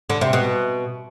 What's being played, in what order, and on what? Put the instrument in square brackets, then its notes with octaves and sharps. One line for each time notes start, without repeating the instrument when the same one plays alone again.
[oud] D3
C3
B2